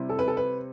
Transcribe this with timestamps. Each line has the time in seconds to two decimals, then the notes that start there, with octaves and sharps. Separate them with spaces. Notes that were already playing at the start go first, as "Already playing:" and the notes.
Already playing: C3 G3 C4 E4
0.09 A4
0.19 B4
0.28 A4
0.37 B4